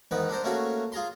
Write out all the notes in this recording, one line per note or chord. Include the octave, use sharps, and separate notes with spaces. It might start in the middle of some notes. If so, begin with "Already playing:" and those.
E2 G#2 D#3 B3 B4
D4 A4 A#4 C5
A3 A#3 C#4 F#4 G#4 A4
F4 G#4 A#5 C6